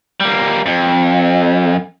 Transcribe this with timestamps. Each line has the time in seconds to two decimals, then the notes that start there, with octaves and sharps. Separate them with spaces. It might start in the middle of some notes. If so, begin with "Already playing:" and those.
0.20 G3 A#3
0.66 F2